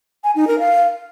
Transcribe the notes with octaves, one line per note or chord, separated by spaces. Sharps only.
G#5
D#4
A#4
F5